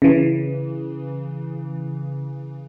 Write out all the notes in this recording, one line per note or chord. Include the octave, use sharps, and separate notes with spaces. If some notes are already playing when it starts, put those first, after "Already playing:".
C#3 E3